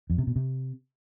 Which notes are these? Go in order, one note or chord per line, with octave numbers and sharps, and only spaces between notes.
F2
C3
B2
C3